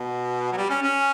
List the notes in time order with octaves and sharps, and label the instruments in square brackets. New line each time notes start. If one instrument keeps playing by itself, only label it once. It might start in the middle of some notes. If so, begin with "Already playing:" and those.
Already playing: [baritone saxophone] B2
F#3
G3
C#4
C#4